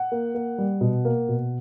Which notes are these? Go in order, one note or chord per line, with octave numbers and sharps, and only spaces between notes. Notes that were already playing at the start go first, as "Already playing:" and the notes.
Already playing: F#5
A#3
A#3
G3
B2
A#3
B2